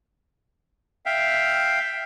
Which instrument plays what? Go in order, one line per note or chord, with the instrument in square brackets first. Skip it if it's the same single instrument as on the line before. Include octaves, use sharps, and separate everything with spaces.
[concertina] E5 F5 G5